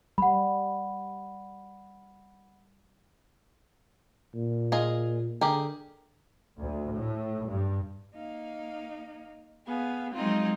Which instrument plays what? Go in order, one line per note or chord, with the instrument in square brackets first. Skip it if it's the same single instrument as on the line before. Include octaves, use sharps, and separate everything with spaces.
[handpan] G3 [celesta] F#5 B5
[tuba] A#2
[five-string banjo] F4 G#4 D#5
[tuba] D3 [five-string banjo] G4 G#4 A#4
[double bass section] D2
A2
G2
[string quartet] A#3 D#4 F5
B3 G#4 F5
F3 F#3 G#3 C4 D#4 F4